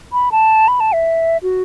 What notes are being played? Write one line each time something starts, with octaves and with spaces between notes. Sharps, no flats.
B5
A5
B5
A5
E5
F#4